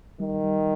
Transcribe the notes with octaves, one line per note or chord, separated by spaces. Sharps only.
D#3 G3
G3